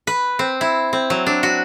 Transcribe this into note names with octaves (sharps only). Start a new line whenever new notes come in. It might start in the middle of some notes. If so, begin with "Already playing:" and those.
B4
C4
E4
C4
F#3
D4
F#4